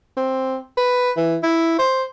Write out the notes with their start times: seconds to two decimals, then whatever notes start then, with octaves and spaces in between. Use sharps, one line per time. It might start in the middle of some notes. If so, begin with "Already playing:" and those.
0.17 C4
0.78 B4
1.17 E3
1.43 E4
1.79 C5